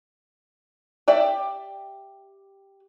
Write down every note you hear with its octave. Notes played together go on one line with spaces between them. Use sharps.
G4 D5 E5